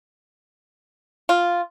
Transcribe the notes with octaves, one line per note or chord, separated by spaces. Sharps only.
F4